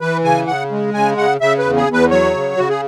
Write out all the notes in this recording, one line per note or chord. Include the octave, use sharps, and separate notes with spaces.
E3 B4
C#3 G#5
C#3 F#5
G#3
C#3 G#5
C#3 F#5
C#3 E5
B4
E2
G#4
E2
B4
F#3 C#5
C#3
C#3 F#4
G#4